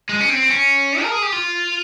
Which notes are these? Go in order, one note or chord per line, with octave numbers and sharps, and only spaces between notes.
G#3
C#4
C4
C#4
A#4
G#4
G4
F4